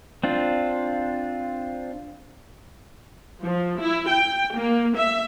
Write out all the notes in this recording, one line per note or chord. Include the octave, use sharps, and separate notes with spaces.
C4 D4 F4
F3
E4
G5
A#3
E5